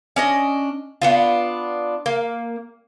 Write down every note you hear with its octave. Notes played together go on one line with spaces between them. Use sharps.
C#4 D4 D#5
B3 D4 F4
A#3